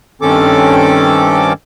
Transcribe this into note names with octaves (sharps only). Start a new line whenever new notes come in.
G2 D#3 C4 C#4 A4 D6